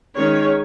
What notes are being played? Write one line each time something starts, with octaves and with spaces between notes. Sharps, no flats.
D#3 G#3 C#4 C#5